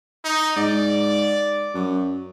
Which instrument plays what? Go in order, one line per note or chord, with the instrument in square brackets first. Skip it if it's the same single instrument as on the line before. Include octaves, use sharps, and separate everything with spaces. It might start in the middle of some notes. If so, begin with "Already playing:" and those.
[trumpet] D#4
[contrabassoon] G#2 [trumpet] D5
[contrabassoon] F#2